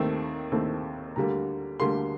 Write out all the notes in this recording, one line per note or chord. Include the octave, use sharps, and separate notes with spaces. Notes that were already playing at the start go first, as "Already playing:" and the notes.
Already playing: D#2 D#3 A3 C4
D#2 D#3 A3 C4
D2 D3 G3 A#3 A#5
D2 D3 G3 A#3 C6